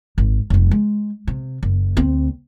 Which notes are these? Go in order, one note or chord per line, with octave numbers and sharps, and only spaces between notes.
G#1
F1 A3
G#3
C3
F#1
D2 C4